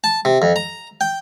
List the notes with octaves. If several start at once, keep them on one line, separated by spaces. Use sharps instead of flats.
A5
C3
F2
A#5
G5